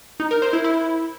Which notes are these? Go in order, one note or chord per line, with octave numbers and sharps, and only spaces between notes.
D#4
A#4
C5
E4
E4